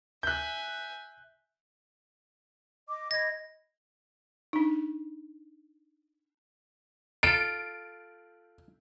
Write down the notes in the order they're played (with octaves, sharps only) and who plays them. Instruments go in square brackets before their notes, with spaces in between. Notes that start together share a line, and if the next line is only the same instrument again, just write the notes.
[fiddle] E5 G#5 [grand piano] F#6 G6
[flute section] D#5 D6
[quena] D#5 [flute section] B5 G#6 [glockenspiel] A#6
[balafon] D4 D#4
[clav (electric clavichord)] F4 A4 [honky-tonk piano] D7